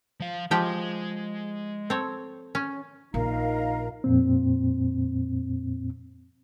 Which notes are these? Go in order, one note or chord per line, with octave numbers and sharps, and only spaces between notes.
F3 F5
F3 G#3 G4 G5
C4 A4 C#5
C#4
A#1 D#4 A#4 F5 A#5
F2 A#2 C4